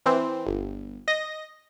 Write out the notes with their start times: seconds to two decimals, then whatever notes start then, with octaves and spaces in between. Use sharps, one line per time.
0.06 E3 C4
0.47 G1
1.08 D#5 A#6